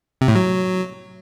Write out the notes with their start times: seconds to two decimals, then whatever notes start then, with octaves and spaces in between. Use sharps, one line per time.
0.21 C3
0.28 A2
0.35 F#3